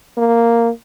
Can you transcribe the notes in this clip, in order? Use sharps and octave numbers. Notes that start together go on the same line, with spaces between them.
A#3